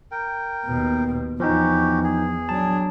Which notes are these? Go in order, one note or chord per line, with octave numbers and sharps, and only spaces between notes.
A#4 G5
D#2 B2
E2 F3 C#4 D#4 F#4 G4
G#4
F#3 D4 A5